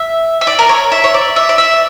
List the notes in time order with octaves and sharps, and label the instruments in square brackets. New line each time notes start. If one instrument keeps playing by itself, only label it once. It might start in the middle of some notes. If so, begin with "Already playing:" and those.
Already playing: [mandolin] E5
E5
D5
A#4
C#5
E5
C#5
D5
E5
D5
E5